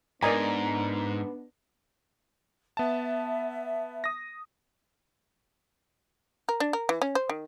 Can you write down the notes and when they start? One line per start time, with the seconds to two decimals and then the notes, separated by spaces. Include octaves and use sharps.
0.22 G#2 B3 D4 A#4 D5 D#5 G#5
2.77 B3 E5 A5
4.04 D#6 A#6
6.49 A#4
6.60 D4
6.73 A#4
6.89 E3
7.02 C#4
7.15 C5
7.29 D#3